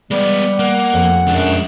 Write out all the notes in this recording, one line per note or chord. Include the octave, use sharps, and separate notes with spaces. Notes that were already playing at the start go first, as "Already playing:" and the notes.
G3 G#3 B3
A#3 F#5
F2
F#2 G#3 D4